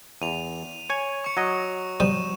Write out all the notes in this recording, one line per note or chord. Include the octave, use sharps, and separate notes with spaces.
E2 D#7 F7
C#5 G#5
C#6 C#7
F#3 D#5
F3 G3 D#6 D#7 E7